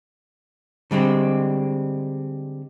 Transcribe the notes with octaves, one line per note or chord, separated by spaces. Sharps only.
D3 G3 G#3 C4